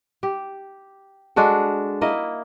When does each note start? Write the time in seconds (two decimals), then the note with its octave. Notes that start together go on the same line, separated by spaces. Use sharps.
0.23 G4
1.36 G#3 D4 F#4 A4
2.01 A#3 E4 D#5